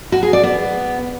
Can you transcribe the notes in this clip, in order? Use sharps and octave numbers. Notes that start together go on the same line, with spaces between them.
F#4
G#4
D5
B3